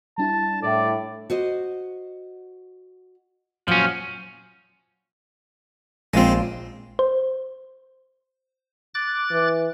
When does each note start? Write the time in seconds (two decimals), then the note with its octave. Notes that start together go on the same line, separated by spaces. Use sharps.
0.18 G3 D4 E4 A5
0.63 A2 D5
1.30 F#4 C5 D#5
3.68 A#2 F3 F#3 C#4
6.14 A#1 G#3 C4 F4
6.99 C5
8.94 D6 F#6 A6
9.31 E3